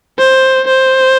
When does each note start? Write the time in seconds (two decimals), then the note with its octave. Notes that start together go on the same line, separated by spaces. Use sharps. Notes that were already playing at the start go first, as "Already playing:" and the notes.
0.19 C5
0.67 C5